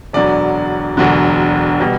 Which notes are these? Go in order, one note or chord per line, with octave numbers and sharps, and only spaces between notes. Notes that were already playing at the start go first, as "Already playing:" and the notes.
E1 D2 D3 F#3 D5
E1 D2 D3 F#3
B2 G3